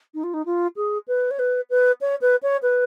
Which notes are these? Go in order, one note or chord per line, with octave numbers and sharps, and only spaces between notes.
D#4
F4
D#4
F4
G#4
B4
C#5
B4
B4
C#5
B4
C#5
B4